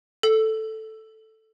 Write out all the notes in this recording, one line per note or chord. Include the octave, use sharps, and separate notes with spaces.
A4